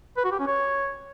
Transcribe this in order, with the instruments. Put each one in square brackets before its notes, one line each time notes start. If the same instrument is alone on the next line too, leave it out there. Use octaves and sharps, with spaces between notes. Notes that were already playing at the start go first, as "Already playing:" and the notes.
[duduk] B4
F#4
G4
C#4
C#5